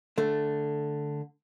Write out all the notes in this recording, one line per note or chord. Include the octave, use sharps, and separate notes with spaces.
D3 A3